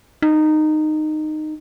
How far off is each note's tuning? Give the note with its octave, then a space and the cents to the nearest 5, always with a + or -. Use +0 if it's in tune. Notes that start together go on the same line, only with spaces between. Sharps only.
D#4 -15